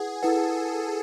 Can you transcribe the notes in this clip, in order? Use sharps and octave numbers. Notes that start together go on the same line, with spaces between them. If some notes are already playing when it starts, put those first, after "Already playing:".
Already playing: E4 G#4 B4 F#5
E4 A4 B4 F#5